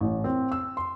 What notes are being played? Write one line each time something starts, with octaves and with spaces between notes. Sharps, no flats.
A1
C4
E6
C6